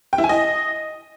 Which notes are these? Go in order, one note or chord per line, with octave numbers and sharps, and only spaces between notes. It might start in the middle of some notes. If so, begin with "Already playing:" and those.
G5
E4
G#5
D#5